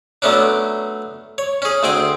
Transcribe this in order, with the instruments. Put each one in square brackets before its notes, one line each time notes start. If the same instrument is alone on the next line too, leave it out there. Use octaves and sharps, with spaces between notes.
[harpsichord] F#3 A3 B3 C#4 D4
C#5
C#4 G#4
D2 C4 G#4 G5